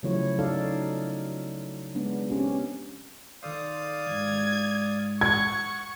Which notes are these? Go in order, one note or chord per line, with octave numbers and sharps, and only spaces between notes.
C#3 F3 F#3 A3 E4 C#5
D#4 F#4 A4 D5 F5
G#3 B3 D4
C4 C#4 G4
D#3 A4 C5 D5 F5 D#6
G#2 G#6
F#5 C#6 G#6